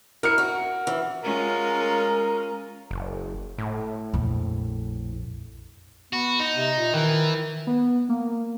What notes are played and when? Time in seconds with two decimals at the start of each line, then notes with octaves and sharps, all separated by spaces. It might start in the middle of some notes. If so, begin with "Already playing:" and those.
0.23 E4 A#4 F6 C#7
0.38 F#4
0.87 E3
1.23 G#3 C#4 F4 A#4
2.91 F#1
3.58 A2
4.14 A#1 F2
6.13 B3 F#4
6.40 D#4
6.56 C3
6.77 A#2
6.93 D#3 E3
7.67 B3
8.09 A#3